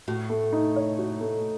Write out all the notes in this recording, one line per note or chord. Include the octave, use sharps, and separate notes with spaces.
A2 F#4
A3
D#4
C#5
F#4
A3